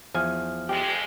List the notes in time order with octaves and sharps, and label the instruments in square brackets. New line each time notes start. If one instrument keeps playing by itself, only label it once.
[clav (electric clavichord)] E2 F3 G#5 [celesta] F6
[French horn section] F2 G#3 [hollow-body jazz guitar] G4